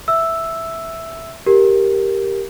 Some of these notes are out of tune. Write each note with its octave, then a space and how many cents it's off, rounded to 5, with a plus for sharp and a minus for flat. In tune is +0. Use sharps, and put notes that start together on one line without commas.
E5 +0 E6 +0
G4 +0 A#4 +0